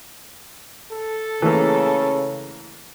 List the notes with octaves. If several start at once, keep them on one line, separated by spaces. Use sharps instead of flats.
A4
C#3 E3 A3 A#3